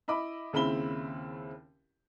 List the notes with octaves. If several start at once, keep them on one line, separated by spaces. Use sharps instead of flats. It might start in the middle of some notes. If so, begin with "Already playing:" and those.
E4 D#5 B5 D6
D#2 C#3 C4 E4 B5 G7